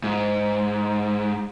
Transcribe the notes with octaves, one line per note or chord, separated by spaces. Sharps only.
G#2